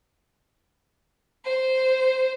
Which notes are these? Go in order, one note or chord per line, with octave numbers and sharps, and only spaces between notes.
C5